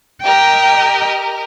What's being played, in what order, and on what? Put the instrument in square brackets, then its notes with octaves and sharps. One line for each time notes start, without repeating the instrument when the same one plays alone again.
[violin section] G4 A#4 D#5 [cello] G5